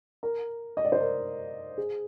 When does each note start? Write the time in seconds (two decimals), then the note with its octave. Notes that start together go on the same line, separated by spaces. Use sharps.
0.23 A#4
0.77 D#5
0.85 D5
0.92 C5
1.01 A#4
1.78 G#4